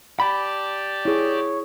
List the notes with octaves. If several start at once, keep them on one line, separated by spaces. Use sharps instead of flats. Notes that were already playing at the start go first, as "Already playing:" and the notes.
G4 D5 A5 B5
E4 G#4 C#5